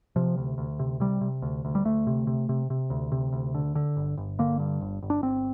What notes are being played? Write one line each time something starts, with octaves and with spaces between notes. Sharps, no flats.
C3 F3
D2
D2
C3
C3 G3
C3
D2
D2
G3
D2 A3
C3
C3
C3
C3
D2
C3
D2
D3
D3
G1
G1
D3 A#3
G2
G1
G1
D4
G1 C4